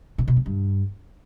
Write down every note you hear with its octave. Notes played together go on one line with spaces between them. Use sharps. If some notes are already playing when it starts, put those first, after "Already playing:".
A#2
B2
E3
G2